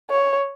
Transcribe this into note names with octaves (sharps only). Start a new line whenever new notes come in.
C#5